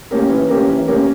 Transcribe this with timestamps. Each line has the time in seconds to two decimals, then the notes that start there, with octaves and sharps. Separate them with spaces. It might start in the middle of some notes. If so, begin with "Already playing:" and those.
0.11 A#3 C#4 G4 A#4
0.29 E3
0.49 A#3 C#4 G4 A#4
0.68 E3
0.87 A#3 C#4 G4 A#4